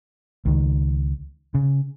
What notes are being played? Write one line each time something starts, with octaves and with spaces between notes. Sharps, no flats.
C#2 D#3
C#3